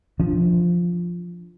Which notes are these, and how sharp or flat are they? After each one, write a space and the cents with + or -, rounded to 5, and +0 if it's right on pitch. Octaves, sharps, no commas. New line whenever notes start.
F3 +0 D4 +0